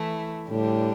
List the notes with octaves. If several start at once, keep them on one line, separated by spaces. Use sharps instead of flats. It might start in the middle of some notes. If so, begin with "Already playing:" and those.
Already playing: E3 A3 E4
A2 D3 G3 D4 G4